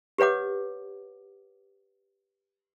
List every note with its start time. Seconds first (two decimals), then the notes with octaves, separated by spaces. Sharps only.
0.18 G4 B4 C#5 F#5 D6